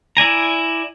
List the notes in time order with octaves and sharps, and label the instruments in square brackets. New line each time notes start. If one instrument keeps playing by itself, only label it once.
[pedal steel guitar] E4 D5 G#5 A#5